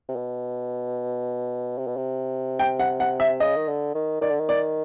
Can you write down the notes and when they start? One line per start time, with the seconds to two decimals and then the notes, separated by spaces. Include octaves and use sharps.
0.09 C3
0.16 B2
1.78 C3
1.87 B2
1.97 C3
2.59 G5
2.80 F#5
3.00 F#5
3.20 E5
3.40 C#3 D#5
3.56 D#3
3.68 D3
3.95 D#3
4.21 D#3 D5
4.31 D3
4.40 D#3
4.49 D5